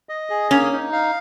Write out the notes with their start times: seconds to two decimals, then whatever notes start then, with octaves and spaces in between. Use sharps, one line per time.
0.09 D#5
0.30 G#4
0.51 A#3 C#4
0.72 D#4
0.93 F5